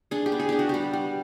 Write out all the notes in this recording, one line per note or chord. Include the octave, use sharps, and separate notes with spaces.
D4 G#4
G4
B3
G#4
D4 G4
F#4
G3 G4
G3